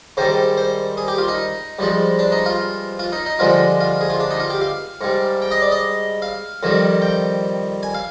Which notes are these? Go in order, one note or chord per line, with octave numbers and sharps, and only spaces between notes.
G#2 D#3 G3 C5
C5
G#4
G4
F4
D#4
G2 F3 G#3
D4
D#4
F4
F4
D#4
D#4
G2 D3 F3 G#3 F4
F4
G#4
F4
D4
D#4
F4
G4
F5
G#2 G3
G5
D#5
D5
D#5
F5
F2 D#3 G3
G5
G#5
F5